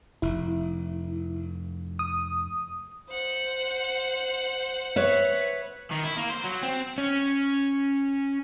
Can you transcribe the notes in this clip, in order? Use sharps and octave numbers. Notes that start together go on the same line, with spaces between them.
F1 E4
D#6
C5 F#5
B4 C#5 E5
D#3
E4
A#3
C5
F#3
C4
C#4